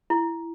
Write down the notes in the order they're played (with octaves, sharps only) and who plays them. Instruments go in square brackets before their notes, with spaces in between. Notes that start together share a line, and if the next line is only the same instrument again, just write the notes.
[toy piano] E4